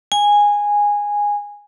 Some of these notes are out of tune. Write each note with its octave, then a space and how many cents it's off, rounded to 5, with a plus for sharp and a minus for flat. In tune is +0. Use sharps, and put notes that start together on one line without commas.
G#5 -10